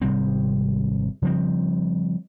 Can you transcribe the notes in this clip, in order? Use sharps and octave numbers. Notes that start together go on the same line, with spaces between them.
G#1 C3 G3 C4
C#3 F3 G3 C4